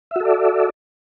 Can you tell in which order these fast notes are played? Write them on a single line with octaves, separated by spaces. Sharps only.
E5 F#4 A4 D5